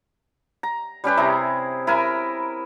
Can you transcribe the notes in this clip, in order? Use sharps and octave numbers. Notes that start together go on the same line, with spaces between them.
A#5
G3 C#4 G4 B4
C3 E4 G#4 A#5
E4 A#4 G#5 B5